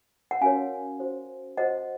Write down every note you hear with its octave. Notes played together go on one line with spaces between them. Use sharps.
F#5
C#4 F#4 A#4 C#5 F5 G#5
F#4 C5
F#4 C5 D#5 F#5